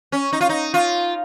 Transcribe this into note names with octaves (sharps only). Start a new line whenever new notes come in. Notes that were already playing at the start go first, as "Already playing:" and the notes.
C#4
D#4
F4
D#4
F4